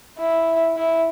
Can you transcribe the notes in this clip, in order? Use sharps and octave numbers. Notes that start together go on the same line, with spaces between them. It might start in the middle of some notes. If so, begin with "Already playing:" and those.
E4
E4